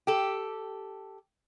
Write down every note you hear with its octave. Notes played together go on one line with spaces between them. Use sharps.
G4 A4